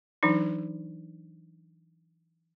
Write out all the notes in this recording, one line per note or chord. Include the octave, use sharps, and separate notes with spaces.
E3 F#3 D4 D#4